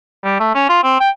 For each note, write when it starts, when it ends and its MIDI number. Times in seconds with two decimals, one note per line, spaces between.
0.24 0.38 55
0.39 0.52 57
0.55 0.65 61
0.69 0.80 65
0.83 0.98 60
1.00 1.10 79